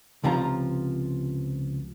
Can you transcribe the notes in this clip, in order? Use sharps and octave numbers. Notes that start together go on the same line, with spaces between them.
C#2 C3 F3 F4 A#5